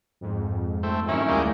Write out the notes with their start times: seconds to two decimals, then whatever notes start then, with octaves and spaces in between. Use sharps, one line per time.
0.21 F2 G#2
0.83 A3 C4
1.09 D#3 F#3 C#4 E4
1.28 D2 G3 G#3 A#3 G6